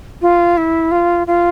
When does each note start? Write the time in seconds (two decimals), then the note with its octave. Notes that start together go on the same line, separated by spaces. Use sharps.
0.22 F4
0.57 E4
0.91 F4
1.27 F4